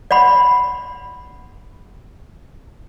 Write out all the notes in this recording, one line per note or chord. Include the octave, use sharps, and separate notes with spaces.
D5 F#5 B5 C6